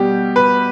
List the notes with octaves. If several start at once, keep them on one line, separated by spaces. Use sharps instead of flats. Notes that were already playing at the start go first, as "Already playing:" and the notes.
Already playing: B2 G3 G4
B4